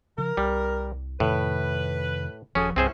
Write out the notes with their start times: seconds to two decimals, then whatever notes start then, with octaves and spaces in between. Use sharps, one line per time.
0.18 C#3 F3 A#4
0.37 C2 G3
1.20 F2 A2 C3 D#3 B4
2.55 D#1 F3 C#4 F#4 G#4 A4
2.76 C2 G2 C3 C4 C#4 E4 G#4 C5